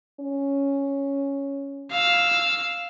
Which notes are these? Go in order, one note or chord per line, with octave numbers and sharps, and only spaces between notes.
C#4
F5 E6